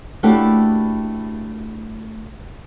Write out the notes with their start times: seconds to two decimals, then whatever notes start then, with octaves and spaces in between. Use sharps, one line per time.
0.23 A3 A#3 D4 E4 F#4 G4